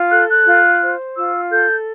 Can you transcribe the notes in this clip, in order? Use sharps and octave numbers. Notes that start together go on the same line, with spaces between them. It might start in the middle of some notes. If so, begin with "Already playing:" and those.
Already playing: F4
A4 F#6
F#6
F4
C5
F4 E6
A4 G6